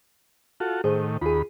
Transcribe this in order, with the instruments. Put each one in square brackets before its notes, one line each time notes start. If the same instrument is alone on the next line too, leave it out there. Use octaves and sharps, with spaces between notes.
[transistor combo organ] F4 F#4 A4
[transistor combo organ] A2 D#3 [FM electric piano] G#4 C5
[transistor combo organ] D#2 B5 [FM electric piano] F4 G#4